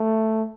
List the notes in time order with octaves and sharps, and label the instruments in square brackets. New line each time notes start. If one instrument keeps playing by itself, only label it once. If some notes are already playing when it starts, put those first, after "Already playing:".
Already playing: [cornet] A3